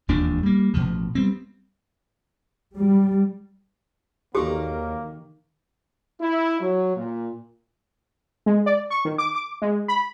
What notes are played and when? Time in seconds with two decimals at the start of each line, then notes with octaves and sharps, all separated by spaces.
0.08 E1 D#2 A#2 D4
0.43 G3 A#3
0.74 A1 B2 E3 F3
1.15 G3 B3 C4
2.77 G3
4.35 D#2 D#3 A#3 D#4 F#4 G4 A4 D5
6.21 E4
6.60 F#3
6.96 A#2
8.46 G#3
8.66 D5
8.90 C#6
9.05 D#3
9.18 D6
9.35 D6
9.62 G#3
9.88 B5